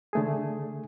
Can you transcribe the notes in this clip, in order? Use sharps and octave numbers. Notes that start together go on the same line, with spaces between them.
D3 A3 G#4